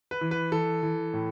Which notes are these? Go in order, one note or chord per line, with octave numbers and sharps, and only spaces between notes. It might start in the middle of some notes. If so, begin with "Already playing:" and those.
B4
E3
B4
E3 A4
E3
A2